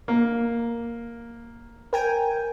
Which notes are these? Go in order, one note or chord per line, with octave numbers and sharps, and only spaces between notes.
A#3
A#4 G5 G#5